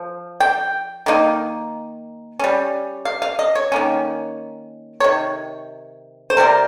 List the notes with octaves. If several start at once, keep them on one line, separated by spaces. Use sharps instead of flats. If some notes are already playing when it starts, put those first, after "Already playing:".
Already playing: F3
G5
D#3 A#3 D#4
G3 C#4
F5
F5
D#5
C#5
D#3 A#3 C#4
C#5
C3 D#3
C5
C3 G3 C4 A#4